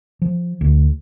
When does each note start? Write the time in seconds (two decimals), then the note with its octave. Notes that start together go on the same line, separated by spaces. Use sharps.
0.22 F3
0.61 D2